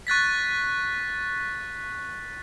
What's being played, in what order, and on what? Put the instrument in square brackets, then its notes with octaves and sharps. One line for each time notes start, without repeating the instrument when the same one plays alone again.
[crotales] C#6 F#6 A6 B6